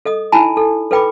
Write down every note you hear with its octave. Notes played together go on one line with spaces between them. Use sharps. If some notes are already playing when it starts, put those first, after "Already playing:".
A4 D#5 D#6
D#4 E4 G#5 A5 B5
A4
A4 B4 G5 B5 D6